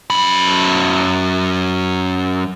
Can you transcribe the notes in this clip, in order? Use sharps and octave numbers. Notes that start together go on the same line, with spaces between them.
F#2 B5